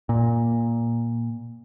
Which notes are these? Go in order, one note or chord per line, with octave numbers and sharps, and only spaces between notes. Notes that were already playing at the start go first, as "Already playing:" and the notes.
A#2